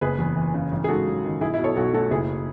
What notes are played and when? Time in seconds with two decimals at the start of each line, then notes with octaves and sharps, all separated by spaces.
0.01 F#1 G#4 B4
0.19 E2
0.36 E3
0.54 C#3
0.72 A1
0.84 G#4
0.88 G#2 F#4 A4
1.07 F#3
1.24 D#3
1.41 B1 E4 G#4
1.54 B2 E4
1.64 A4 C#5
1.76 B1 F#4 A4
1.93 A3 F#4 A4
2.11 F#1 E4 G#4